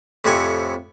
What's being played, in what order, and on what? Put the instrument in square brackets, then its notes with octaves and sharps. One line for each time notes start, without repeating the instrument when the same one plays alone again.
[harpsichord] F2 A2 C3 F#5 G#5